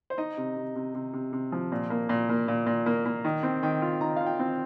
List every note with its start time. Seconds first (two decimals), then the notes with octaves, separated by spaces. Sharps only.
0.10 C5
0.18 D#4 D#5
0.37 C3
0.57 C3
0.75 C3
0.95 C3
1.13 C3
1.33 C3
1.52 F3
1.72 A#2
1.90 A#3
2.09 A#2
2.29 A#3
2.48 A#2
2.66 A#2
2.86 A#3
3.05 A#3
3.25 D#3
3.43 C4
3.63 D#3 G5
3.82 F4
4.01 D#3 A#5
4.17 F4 F5
4.26 G5
4.39 C4